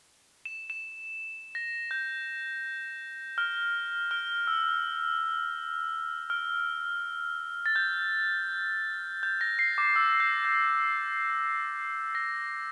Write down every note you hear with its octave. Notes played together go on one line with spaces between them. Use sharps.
E7
E7
A#6
G6
F6
F6
E6
F6
A6
G6
G6
A#6
C7
D6
E6
G6
G6
A#6